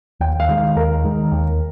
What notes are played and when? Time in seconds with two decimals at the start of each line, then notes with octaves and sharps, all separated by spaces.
0.20 D#2 G5
0.40 F5
0.49 D#3 G#3
0.58 F5
0.76 D#2 A#4
1.04 D#3 G#3
1.31 D#2